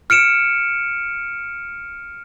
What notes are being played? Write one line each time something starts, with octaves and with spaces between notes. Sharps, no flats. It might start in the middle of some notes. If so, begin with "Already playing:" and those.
F6 C#7 D7 E7